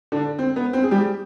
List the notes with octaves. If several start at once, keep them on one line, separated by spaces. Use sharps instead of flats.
D3 D4
C4
B3
C4
G#4
G3 G4